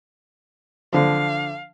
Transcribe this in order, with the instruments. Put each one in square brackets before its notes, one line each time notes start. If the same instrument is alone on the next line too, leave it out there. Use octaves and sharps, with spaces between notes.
[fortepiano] D3 F3 [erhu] F5